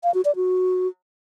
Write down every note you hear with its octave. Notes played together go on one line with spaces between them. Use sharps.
F5
F#4
D5
F#4